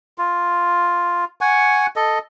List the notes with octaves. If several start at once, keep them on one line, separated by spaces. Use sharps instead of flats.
F4
F#5 G#5 C#6
A4 D#5